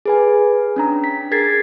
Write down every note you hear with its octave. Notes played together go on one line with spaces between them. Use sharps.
G#4 B4 G#5
C#4 D4 A#5
B6
G#4 A#4 G#6 A6 B6 C7